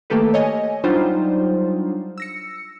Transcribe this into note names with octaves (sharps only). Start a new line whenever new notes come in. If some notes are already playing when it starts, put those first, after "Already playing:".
D#3 A3 A#3 G4 A4 B4
C#5 D#5 G#5
F#3 G3 D4 D#4 F4 C5
E6 A#6 C#7